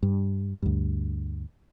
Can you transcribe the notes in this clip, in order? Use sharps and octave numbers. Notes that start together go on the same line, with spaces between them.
G2
D2 G2